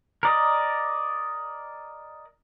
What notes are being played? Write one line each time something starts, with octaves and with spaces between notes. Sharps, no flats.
A#4 D5 D#5